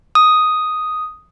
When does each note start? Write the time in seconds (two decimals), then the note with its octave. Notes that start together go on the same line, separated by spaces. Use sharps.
0.15 D#6